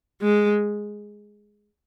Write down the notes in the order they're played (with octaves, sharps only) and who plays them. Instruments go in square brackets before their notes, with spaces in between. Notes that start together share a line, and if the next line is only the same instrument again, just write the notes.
[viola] G#3